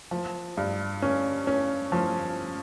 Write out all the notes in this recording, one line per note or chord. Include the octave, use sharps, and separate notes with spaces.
F3
G2
C#4
C#4
F3